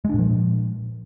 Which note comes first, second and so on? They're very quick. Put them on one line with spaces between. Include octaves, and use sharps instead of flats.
G#3 D4 A#2 F3